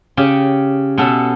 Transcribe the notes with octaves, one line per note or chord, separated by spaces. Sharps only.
C#3 C#4 G4
B2 B3 C#4 A4 E5